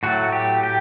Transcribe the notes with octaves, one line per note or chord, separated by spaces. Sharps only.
A2 F#3 A3 F#4
G4
G4